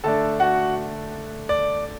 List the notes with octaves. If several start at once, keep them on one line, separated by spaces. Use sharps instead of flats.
D3 A3 D4 A4 A5
F#4 F#5
D5